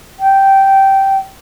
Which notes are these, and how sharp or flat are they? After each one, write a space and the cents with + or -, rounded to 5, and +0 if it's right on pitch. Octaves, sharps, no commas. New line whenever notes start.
G5 -10